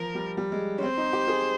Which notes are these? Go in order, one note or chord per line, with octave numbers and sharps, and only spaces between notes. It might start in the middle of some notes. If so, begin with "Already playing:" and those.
Already playing: F3 A#4
G3
G3
G#3
C#4
C4 C5
D#4
G4
G#4